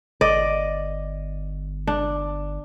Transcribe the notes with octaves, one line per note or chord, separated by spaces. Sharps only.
G1 D5 D#5
D4